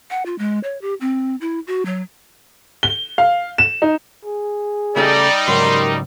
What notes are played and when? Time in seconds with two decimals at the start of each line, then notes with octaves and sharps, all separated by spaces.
0.10 F#5
0.26 F4
0.38 G#3
0.63 C#5
0.81 G4
1.01 C4
1.41 E4
1.67 F#4
1.85 F#3
2.83 G7
3.18 F5
3.58 E7
3.82 D#4
4.25 G#4
4.96 C#3 G3 A3 D#4 A4 D5
5.48 C#2 G#2 F#3 A#4 C6